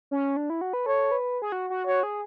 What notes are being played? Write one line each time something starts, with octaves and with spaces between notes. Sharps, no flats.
C#4
D4
E4
F#4
B4
A4 C#5
B4
G#4
F#4
F#4
F#4 C#5
G#4